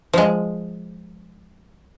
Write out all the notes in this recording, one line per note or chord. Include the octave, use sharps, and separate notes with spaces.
F3 G#3